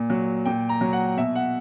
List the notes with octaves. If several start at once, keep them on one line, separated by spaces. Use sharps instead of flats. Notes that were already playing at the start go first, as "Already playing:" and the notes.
Already playing: A#2
F#3
A#2 G5
A#5
F#3
F#5
B2 E5
F#5